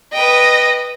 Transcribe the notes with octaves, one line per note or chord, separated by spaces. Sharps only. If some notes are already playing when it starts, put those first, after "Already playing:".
B4 D#5 G5